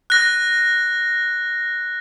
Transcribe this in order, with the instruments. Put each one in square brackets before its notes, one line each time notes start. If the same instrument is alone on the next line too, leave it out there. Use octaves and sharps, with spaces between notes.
[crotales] F#6 A#6